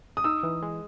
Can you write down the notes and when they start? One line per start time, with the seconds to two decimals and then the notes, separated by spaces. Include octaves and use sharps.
0.17 D#6
0.24 D#4 E6
0.43 E3
0.62 G#3